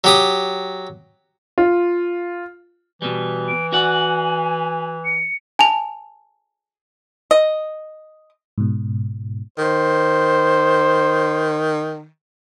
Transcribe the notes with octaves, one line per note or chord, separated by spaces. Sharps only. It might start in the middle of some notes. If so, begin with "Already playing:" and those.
F#3 G4 D#6
F4
B2 E3 G3
D7
F#4 D5 F#5 G#5
C#7
G#5 A5 F7
D#5
G#2 B2
D#3 C5